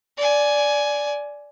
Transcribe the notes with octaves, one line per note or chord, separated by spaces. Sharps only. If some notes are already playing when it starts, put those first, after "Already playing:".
D5 G#5